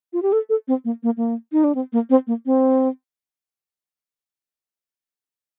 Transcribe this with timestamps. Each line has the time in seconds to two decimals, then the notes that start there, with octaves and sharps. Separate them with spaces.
0.13 F4
0.22 G4
0.32 A4
0.50 A4
0.68 C4
0.85 A#3
1.03 A#3
1.17 A#3
1.52 D#4
1.64 D4
1.75 C4
1.93 A#3
2.10 C4
2.27 A#3
2.46 C4